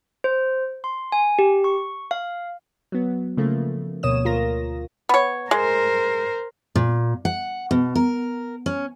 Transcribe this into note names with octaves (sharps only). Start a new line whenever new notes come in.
C5
C6
G#5
G4
C#6
F5
F#3 B3
C#3 F3 A3 A#3
D2 B2 A#3 C#5 D#6 E7
D2 F4 A#4 A#6
B3 C#5
G#3 A#4 C5
A#2
F#5
B2
A#4
C#4